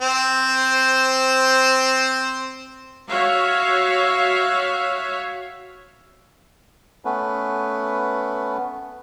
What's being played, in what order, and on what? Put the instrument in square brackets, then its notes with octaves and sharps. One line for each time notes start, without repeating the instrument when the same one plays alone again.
[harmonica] C4 C5
[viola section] F#4 C#5 E5 F5
[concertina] A3 B3 C#4 B4